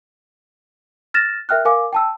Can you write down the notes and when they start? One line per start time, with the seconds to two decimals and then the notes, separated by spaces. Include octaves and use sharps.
1.14 F6 A6 A#6 E7
1.49 A#4 E5 G5 F6 F#6
1.65 A#4 F5 G#5 D6
1.93 G5 A5 E6